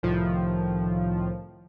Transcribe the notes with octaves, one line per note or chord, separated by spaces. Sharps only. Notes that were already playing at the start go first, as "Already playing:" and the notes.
C2 A2 D#3 F3